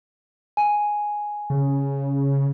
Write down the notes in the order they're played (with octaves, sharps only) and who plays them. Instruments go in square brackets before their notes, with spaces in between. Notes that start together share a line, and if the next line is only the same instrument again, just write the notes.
[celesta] G#5
[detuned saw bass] C#3